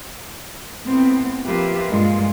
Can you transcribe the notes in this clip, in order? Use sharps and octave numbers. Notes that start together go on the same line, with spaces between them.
A2 B3 C4
F3 A#3 F4 G4 B4 E5
G2 A#2 G#3 A#3 F4